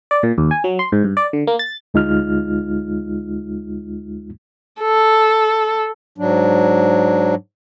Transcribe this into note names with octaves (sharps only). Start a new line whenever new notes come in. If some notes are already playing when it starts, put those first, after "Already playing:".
D5
A#2
D#2
G#5
F#3
C6
G#2
G2
D5
D3
A#3
A6
D2 G#3 D#4 F4 F6
A4
G#2 F#3 D4